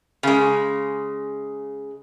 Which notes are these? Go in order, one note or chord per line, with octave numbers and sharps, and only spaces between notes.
C#3 G#3